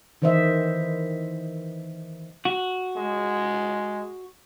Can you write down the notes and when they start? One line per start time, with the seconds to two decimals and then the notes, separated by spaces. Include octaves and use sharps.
0.22 D#3 E3 C5 D#5 E5
2.45 F#4
2.97 G#3